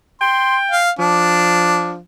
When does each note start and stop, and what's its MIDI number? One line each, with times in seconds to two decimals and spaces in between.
0.21 0.82 79
0.21 0.56 84
0.71 0.90 77
0.99 2.00 53
0.99 1.95 62